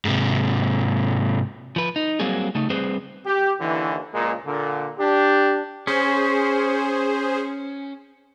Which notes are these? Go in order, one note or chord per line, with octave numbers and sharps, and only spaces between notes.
G#2 C3
F3 B4
D#4
F#3 G3 A#3 C4 G#4
C#3 A3 D#4
G3 C4 G#4 B4 C5
G4
D#2 D3 E3
C#2 A#2 G#3 A#3
A#2 D3
D4 G4
C#4 G#4 C5